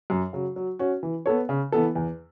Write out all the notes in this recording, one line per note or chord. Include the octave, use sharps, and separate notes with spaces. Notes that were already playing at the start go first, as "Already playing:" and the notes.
F#2
C#3 F#3
F#3
C#4 F#4
E3
B3 A4 C#5
C#3
E3 B3 A4
E2